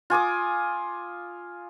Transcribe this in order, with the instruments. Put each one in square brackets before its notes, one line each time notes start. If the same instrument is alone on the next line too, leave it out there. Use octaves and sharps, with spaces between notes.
[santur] F4 G#5 D6 D#6